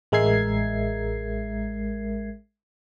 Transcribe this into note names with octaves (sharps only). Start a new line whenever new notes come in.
A1 G#3 A#4 E5 G#6 C7